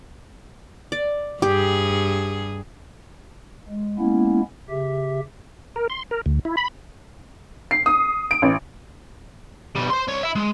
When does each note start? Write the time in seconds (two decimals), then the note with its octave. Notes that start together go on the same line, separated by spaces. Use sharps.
0.92 D5
1.42 G2 G4 G#4
3.68 G#3
3.99 G#3 A#3 B3 C#4 E4
4.69 C#3 G4 E5
5.76 A#4
5.90 C6
6.11 A#4
6.26 D2
6.45 E4
6.57 B5
7.71 C7
7.86 D#6
8.31 D7
8.42 A1
9.76 B2 G3
9.90 C5 C6
10.08 C2 C#5
10.23 E4 E5
10.36 G#3